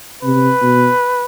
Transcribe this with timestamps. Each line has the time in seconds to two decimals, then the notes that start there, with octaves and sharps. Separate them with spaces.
0.23 C3 B4
0.62 B2